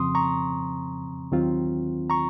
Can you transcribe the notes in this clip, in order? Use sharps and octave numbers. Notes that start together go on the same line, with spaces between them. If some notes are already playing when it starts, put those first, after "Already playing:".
Already playing: F2 C#3 F3 C4 C6 D#6
A#5 C#6
D#2 D#3 F#3 C4 F4
A#5 C#6